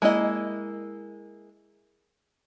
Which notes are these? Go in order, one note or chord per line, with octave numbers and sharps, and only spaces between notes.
G#3 A#3 E4 D#5